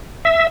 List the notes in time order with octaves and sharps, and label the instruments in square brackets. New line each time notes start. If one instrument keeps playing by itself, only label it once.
[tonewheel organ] E5